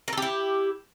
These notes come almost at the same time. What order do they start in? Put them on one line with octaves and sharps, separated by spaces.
A#4 A4 G4 E4